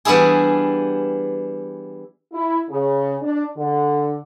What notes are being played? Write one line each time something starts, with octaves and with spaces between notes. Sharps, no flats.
E3 G3 B3 D4 E4 G#4
E4
C#3
D4
D3